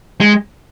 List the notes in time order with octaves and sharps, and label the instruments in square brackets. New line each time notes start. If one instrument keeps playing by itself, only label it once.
[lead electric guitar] G#3